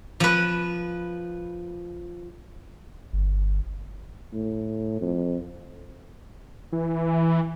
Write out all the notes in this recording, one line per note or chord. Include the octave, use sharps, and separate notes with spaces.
F3 B4
G1
A2
F2
E3